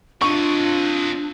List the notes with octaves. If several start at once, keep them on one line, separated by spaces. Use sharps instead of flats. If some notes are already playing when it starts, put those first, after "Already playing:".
C4 D4 F4 D#5 C#6